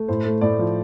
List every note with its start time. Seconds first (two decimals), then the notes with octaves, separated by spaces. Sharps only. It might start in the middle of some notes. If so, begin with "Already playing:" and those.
Already playing: A3
0.08 A2 C5
0.25 A3
0.41 A2 D5
0.59 F3